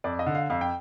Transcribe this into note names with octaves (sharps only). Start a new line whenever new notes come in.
F2 D5
D#5
D3
F5
F2 F5
G5